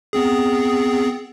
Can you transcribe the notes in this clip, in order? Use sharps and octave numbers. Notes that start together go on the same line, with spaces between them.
B3 C4 G#4